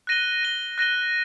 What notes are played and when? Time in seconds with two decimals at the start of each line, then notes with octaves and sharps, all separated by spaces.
0.07 F#6 A#6 D#7 G7
0.43 F#6 A#6 D#7 G7
0.78 F#6 A#6 D#7 G7